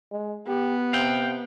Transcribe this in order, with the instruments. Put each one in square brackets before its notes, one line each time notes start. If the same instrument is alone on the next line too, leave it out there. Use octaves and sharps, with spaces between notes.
[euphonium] G#3
[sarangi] B3 [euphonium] G4
[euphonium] C3 [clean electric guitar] F5 G5